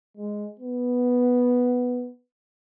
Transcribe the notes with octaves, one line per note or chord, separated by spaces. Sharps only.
G#3
B3